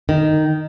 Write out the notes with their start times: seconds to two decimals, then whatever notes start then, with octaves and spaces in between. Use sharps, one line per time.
0.09 D#3